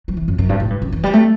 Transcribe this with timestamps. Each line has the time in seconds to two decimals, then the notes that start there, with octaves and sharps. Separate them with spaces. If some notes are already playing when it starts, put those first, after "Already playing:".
0.08 F#3
0.17 E3
0.28 F#2
0.38 F#2
0.49 G2
0.60 A2
0.70 G2
0.82 F#2
0.92 E3
1.03 G3
1.13 A3